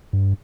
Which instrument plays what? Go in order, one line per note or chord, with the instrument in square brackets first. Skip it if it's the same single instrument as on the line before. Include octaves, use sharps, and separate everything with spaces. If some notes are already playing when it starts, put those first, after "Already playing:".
[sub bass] G2